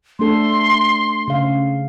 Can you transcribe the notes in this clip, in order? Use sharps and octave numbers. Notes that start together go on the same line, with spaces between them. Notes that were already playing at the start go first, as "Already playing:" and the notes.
A3 D4 A4 C6
C#3 F5